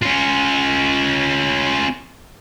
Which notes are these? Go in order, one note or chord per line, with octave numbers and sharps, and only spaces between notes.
C#4 F4